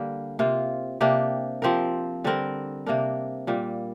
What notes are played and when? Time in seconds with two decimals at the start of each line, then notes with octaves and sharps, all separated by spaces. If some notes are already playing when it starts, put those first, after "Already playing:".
Already playing: D3 G3 A#3 G4
0.39 C3 A#3 F4
1.01 C3 A#3 D4 G4
1.62 F3 C4 G4 A#4
2.24 D3 G3 C4 A#4
2.86 C3 A#3 D4 A#4
3.47 A#2 G3 A#3